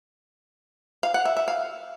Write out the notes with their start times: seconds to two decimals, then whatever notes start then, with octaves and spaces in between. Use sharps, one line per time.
1.03 F5
1.14 F#5
1.25 E5
1.37 E5
1.48 F5